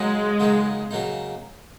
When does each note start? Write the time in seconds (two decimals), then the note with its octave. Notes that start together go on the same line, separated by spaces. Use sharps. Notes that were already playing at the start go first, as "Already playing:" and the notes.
Already playing: C#3 F#3 G#3 A#3 D#4
0.40 C#3 F#3 A#3 D#4
0.91 C#3 F#3 A#3 D#4